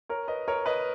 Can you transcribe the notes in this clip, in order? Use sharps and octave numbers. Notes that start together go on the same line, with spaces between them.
A#4 C#5
B4 D#5
A#4 C#5
B4 D#5